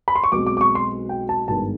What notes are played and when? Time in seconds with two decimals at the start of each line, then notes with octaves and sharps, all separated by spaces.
0.08 B5
0.16 C6
0.24 C#6
0.32 B1 B2 G#3 C4 D6
0.47 D6
0.57 D6
0.61 C#6
0.75 C6
1.09 G5
1.29 A5
1.48 G#1 G2 D#3 G#3 B3 A5